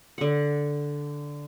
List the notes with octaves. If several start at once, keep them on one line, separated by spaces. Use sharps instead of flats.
D3 F#5